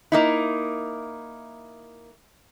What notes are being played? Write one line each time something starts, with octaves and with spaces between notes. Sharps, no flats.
A#3 D#4 E4